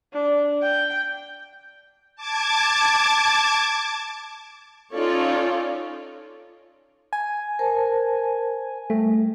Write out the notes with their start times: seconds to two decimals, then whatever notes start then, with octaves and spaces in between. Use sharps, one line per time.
0.13 D4
0.62 G5
2.16 A5 D6 G#6
4.95 C#4 D#4 F4 A4 C#5 D5
7.13 G#5
7.59 A#4 C5 A5
8.90 G3 A3